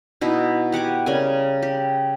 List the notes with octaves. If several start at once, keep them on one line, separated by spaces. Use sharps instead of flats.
B2 D#4 E4
G4 F#5 G#5 D6
C#3 G3 A#4 G#5
G4